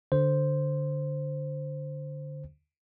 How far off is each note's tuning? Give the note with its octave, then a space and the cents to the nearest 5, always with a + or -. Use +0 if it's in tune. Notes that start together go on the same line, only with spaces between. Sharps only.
D3 +0 C5 +0